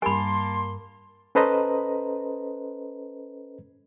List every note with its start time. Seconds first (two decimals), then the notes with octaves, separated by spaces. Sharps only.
0.02 G2 A#3 A#4 G#5 A5 B5 C6
1.35 C#4 A4 B4 C5 D#5 A#5